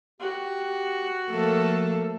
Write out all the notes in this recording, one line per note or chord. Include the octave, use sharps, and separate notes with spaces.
F#4 G4
F3 A3 A#3 A4